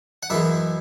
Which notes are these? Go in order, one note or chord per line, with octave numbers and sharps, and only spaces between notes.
F#5
F#2 E3 G#3 E5